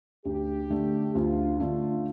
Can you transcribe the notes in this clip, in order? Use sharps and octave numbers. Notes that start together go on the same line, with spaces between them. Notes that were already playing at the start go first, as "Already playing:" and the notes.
D2 G4
D3 A3
D2 F4
D3 A3 F4